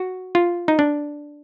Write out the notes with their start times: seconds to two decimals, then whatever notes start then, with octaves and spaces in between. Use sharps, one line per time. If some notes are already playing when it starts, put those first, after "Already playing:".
Already playing: F#4
0.35 F4
0.68 D#4
0.79 D4